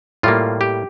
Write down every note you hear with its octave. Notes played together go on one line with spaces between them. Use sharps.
A2 G3 A#3 F4
G4